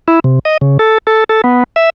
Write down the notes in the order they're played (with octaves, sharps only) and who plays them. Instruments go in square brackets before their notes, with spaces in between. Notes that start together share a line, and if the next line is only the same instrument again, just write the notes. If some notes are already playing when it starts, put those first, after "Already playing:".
[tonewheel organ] E4
C3
D#5
C#3
A4
A4
A4
B3
E5